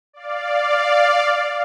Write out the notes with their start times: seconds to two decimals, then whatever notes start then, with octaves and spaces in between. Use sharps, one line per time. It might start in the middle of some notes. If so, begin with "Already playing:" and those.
0.13 D5 F5